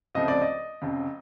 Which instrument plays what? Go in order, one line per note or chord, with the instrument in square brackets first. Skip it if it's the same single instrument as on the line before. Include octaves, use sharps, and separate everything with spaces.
[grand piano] C#2 C3 F3 A3 [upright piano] D#5
[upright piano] D5
D#5
[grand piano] F1 F2 C#3